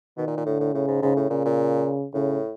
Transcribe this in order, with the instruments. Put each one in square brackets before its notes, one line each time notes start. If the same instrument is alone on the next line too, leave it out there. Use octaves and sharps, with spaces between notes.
[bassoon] B2 [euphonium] D#3
[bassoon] A#2
A#2
[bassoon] A2 [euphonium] D3
[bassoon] A2
[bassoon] A2 [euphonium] C#3
[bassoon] G#2
[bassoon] G#2 [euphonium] C#3
[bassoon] A2
[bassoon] A#2 [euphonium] C#3
[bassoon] A#2
[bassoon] A2 [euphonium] C#3